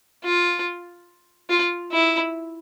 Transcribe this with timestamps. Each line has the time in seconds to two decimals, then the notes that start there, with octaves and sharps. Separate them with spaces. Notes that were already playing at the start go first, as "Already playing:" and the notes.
0.24 F4
1.50 F4
1.92 E4